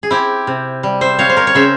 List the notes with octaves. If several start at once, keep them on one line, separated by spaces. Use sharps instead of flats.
G#4
C4 E4 G4
C3
G3
C5 E5
C4 C#5 F5
C5
A#4 C#5
C#5
C#3 C5 E5